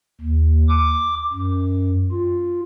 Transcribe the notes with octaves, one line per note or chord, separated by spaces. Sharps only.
D#2
D6
F#2
F4